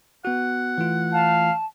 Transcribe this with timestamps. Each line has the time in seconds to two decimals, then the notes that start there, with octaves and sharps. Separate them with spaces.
0.25 B3 F#4 F#5
0.78 E3 A3 F4
1.13 F5 A5